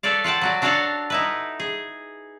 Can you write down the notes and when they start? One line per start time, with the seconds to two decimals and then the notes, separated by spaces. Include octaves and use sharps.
0.03 A4 B4 C#5 D5 F5
0.24 F4 F#5 G5 A5
0.42 F#3 F#4 D5
0.62 D4 F#4 A4 C#5 F5 F#5
1.10 D#4 E4 B4
1.60 G#4